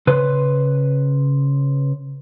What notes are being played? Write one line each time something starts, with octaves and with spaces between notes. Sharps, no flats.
C#3 B4 C5